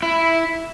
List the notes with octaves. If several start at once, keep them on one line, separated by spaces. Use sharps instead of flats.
E4